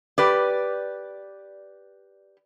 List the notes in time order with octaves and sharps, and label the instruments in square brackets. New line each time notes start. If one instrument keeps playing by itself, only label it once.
[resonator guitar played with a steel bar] G4 B4 D5